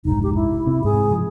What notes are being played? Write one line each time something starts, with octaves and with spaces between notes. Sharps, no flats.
F1 B1 G#2 D#4
G4
E4
C3
G#2 C3 G#4
F3